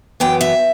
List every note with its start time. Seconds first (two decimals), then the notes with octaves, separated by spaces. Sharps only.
0.20 F#2 E3 B3 G5
0.41 E5